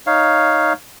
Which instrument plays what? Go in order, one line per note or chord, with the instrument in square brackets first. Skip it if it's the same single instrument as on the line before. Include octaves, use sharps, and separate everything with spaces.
[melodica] D#4 C#5 F5